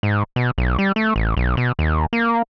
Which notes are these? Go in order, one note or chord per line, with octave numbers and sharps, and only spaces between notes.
G#2
B2
B1
G3
A3
A1
B1
B2
D#2
A#3